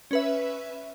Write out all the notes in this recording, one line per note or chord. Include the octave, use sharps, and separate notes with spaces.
C#4 B4 E5